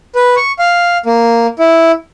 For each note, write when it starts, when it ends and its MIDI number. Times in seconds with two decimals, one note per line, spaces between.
0.15 0.35 71
0.36 0.52 85
0.59 0.97 77
1.06 1.47 58
1.59 1.92 64